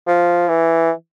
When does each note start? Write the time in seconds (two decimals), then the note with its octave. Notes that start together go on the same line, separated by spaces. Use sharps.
0.07 F3
0.49 E3